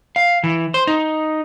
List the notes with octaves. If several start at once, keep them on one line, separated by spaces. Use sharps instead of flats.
F5
E3
C5
D#4